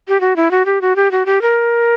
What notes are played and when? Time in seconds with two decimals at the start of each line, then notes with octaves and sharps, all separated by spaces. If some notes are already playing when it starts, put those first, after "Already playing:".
0.08 G4
0.21 F#4
0.36 E4
0.51 F#4
0.66 G4
0.81 F#4
0.96 G4
1.11 F#4
1.26 G4
1.42 A#4